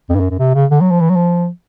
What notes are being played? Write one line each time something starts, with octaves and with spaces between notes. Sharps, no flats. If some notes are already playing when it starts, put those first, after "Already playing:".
F2
G2
F#2
F#2
C3
C#3
D3
F#3
F3
E3
F#3
F3